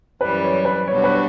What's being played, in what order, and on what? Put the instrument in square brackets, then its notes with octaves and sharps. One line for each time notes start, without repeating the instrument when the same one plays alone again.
[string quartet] F#2 E3 G3 [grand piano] B4
[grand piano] C#5
B4
[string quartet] B2 G3 D4 F#4 [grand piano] C#5
[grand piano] B4